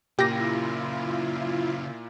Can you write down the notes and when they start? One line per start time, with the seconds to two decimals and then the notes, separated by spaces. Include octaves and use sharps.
0.19 A#2 C#3 A#3 E4 F4 G4 A#6